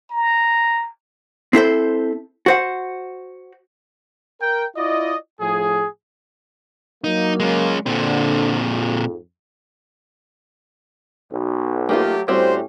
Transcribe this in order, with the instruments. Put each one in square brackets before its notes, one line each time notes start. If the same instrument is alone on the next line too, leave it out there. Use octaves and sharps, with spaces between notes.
[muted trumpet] A#5
[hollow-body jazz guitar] C4 E4 A4 C5
F#4 C5 F#5
[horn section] A#4 G5
E4 F4 D5 D#5
A2 F3 G#4
[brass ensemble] F#3 A#3 [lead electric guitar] D#4
[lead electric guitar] G#3 C#4
[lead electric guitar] A#2 C4 [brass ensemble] D3
[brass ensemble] F2 G#2
[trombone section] B1
[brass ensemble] F#3 A3 G4 [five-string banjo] A#3 D#4 F4
[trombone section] A2 C#4 G4 [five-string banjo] G3 C4 F#4 [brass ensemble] C5